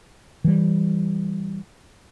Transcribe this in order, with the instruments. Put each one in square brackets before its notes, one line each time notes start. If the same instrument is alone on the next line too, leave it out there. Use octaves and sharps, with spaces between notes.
[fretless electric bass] E3 G3